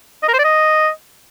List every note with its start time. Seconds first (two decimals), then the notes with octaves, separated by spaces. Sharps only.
0.23 D#5
0.28 A#4
0.34 C5
0.39 D5
0.44 D#5